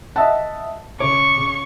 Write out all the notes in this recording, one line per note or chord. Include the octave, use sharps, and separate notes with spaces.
D#5 E5 F#5 A5
C#3 C#5 C#6 D6